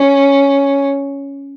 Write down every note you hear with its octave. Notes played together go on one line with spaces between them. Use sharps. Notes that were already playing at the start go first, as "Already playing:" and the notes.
Already playing: C#4